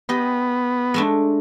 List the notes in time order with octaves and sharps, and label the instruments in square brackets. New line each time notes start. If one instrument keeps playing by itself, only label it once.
[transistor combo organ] B3 [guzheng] G4 D#5
[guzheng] G#3 A3 D4